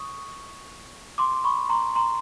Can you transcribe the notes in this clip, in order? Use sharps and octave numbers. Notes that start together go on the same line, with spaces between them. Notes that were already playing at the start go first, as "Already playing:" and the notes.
Already playing: C#6 D#6
C6 D6
B5 C#6
A#5 C6
A#5 C6